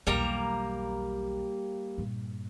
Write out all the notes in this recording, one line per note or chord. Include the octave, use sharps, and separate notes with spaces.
B1 E2 G3 A#3 A#5
G2 A#2